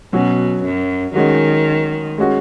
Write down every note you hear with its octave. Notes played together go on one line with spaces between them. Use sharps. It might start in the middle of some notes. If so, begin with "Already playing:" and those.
B2 F#3 C#4 F#4
F#2
D#3 G#3 C#4 F#4
G#3 C#4 F#4